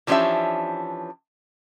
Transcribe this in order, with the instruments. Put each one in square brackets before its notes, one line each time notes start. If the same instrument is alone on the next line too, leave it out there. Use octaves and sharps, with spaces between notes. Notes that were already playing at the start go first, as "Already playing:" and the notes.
[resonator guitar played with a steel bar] E3 F3 C#4 D4 G4 E5